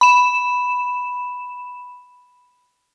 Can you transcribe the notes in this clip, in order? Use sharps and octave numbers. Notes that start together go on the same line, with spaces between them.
B5 E7